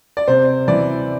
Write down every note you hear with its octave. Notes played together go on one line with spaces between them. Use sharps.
D5
C3 C5
E3 D5